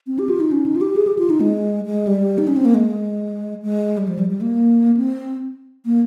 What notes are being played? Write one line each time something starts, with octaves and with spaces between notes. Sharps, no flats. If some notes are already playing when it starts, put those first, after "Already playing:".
C4
G4
F4
D#4
C#4
D#4
F4
G4
G#4
G4
F4
D#4
G#3
G#3
G3
D#4
C#4
C4
A#3
G#3
G#3
G3
F3
G3
G3
A#3
C4
A#3